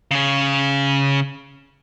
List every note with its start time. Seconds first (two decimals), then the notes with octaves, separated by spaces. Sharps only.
0.11 C#3 C#4